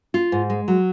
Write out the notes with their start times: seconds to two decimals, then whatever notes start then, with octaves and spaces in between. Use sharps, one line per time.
0.14 F4
0.32 G#2
0.50 G#3
0.68 F#3